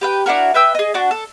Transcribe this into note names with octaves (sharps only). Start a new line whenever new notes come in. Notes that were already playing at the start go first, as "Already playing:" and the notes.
G4 B4 G5
D4 E4 F#4 A#4
B4 E5 G5 E6
G#4 D#5
D4 F#4
A4